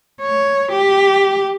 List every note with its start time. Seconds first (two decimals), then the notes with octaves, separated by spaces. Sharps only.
0.21 C#5
0.72 G4